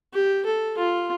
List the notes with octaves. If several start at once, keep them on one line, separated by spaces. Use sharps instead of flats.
G4
A4
F4